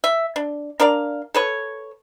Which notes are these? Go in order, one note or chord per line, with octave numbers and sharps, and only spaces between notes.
E5
D4
D4 A#4 D5 F5
A4 B4 C#5